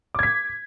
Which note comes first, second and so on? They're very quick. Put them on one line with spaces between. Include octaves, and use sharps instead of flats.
D6 G#6 B6